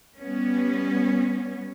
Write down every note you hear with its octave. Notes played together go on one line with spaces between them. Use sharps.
G3 B3 C#4